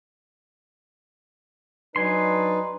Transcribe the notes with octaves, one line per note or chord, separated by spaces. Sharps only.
F#3 D4 D#4 B4 G#5 C6